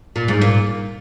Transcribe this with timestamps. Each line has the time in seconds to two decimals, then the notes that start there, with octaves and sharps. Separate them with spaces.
0.16 A#2
0.28 G#2
0.41 A#2